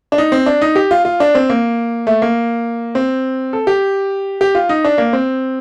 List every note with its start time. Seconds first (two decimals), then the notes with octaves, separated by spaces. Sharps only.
0.12 D4
0.18 D#4
0.32 C4
0.46 D4
0.62 D#4
0.76 G4
0.91 F4
1.05 F4
1.20 D4
1.35 C4
1.50 A#3
2.07 A3
2.22 A#3
2.95 C4
3.53 A4
3.67 G4
4.41 G4
4.55 F4
4.69 D#4
4.85 D4
4.98 A#3
5.13 C4